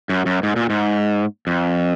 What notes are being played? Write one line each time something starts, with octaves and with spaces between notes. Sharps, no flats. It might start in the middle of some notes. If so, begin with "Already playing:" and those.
F#2
F#2
G#2
A#2
G#2
F2